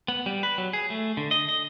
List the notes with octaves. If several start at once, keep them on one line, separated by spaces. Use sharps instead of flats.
B3
G3
B4
F#3
G#4
A3
D3
D#5
D#5